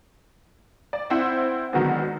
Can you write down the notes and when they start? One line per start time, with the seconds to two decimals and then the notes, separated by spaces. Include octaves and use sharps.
0.93 D5
1.10 C4 E4 C5 F#5
1.73 D3 D#3 F#3 G#3 B3